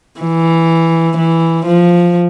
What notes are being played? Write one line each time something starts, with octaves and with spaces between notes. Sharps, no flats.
E3
E3
F3